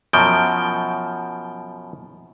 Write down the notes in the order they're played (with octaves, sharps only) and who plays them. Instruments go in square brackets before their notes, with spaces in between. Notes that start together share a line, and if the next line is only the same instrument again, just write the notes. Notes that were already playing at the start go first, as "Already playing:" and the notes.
[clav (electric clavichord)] F#2 B2 F3 G5